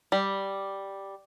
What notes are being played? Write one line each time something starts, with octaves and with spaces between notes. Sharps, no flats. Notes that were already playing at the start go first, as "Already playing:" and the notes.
G3